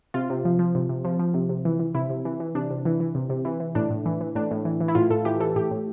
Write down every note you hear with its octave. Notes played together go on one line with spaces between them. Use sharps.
C3 F4
C3
F3
F3
C3
C3
F3
F3
C3
C3
E3
E3
C3 E4
C3
E3
E3
C3 D4
C3
E3
E3
C3
C3
E3
E3
A2 D4
A2
E3
E3
A2 D4
A2
E3
E3
E4
A2 F4
A2 A4
E3 G4
E3 A4
A2 G4
A2